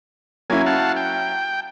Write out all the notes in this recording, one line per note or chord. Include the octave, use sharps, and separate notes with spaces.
F#3 A#3 C#4 E4 G#5
F5 F#5 A5
G5